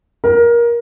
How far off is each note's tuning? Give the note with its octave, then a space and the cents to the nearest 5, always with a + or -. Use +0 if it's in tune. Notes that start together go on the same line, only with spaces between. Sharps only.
A#4 +20